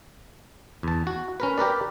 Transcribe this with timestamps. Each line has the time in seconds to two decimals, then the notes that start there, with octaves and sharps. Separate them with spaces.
0.83 E2 A5
1.07 F#4
1.40 C#4 A#4 B4
1.58 G4 A#4 B4 D5